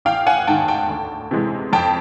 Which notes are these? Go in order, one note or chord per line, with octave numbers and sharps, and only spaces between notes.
A1 F5 G5
F#5 G#5
G#2 D#3 G5 A5
G5 A5
D2
C3 E3 G#3
F2 G5 A5